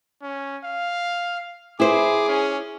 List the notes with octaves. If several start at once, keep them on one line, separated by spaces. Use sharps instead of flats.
C#4
F5
E4 G#4 C5 D6
C#4